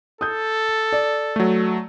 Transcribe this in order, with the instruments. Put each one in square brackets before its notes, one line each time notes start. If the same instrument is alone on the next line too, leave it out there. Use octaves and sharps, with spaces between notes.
[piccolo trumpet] A4 [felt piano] D#6 G6
[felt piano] D5
[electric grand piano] F#3 A3